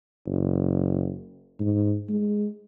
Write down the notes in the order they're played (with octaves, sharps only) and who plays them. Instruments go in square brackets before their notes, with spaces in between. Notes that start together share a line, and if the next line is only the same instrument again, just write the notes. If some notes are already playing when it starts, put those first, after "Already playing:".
[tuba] F#1
G#2
G#3